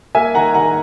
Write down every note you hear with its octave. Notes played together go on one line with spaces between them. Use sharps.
A#3 E5 G#5
D#3 F#5 A#5
D#3 F#5 A#5